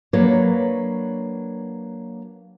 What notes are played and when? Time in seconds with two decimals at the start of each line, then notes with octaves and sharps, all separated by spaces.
0.13 F#3 A#3 D4 B4 C#5